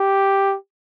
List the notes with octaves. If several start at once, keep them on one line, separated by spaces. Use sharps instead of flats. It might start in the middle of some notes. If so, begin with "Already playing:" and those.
Already playing: G4